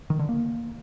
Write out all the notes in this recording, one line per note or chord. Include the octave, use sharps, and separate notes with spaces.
D#3
D3
A#3